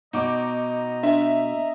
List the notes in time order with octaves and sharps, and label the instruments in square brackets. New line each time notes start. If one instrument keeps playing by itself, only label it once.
[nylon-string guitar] B2 [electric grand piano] D#4 D6 [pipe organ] D#5 A#5
[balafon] D4 [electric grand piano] E5